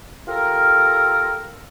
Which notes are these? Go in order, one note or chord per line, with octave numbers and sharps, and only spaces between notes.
F4 G4 A4 A#4